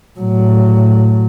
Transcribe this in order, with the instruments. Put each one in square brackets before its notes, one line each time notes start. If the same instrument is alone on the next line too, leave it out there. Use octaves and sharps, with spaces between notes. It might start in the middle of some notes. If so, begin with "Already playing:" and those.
[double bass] A2 F#3